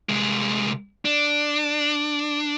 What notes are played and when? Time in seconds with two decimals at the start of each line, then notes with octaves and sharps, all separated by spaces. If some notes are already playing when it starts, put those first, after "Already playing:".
0.09 C2 G#3
1.05 D4